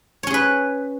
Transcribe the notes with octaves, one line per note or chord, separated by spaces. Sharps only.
C#4 G#4 B4 C#5